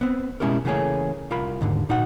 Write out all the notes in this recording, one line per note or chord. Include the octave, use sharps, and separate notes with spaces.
B3 C4
B2 G#3 C#4 E4 G4 A#4
C#3 E3 A3 A#3 G#4 C#5
C2 F4 A#4 B5
D#2 G#2 D3
A#2 D#4 F#4 F#5